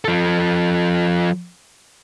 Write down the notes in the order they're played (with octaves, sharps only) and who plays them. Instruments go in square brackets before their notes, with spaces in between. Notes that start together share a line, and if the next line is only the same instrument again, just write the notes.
[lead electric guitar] F3 A4